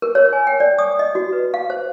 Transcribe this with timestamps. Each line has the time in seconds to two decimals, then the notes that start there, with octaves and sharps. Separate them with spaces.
0.02 A#4
0.15 C#5
0.33 G#5
0.47 G5
0.60 D5
0.78 D#6
0.99 D#5
1.15 F#4
1.33 B4
1.54 F5
1.70 C5